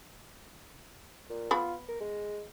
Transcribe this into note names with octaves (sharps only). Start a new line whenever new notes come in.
A#2
B3 F4 B5
A#4
G#3